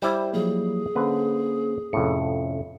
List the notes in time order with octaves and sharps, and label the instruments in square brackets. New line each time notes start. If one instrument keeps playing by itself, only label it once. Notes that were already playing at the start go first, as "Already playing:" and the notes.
[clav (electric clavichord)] G3 E4 D5 [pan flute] C5
[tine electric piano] F3 F#3 A#3 [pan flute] G#4
[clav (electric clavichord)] D3 B4 [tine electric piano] A#3 C#4 C5
[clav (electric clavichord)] F2 A2 [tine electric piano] C3 C#4 C#7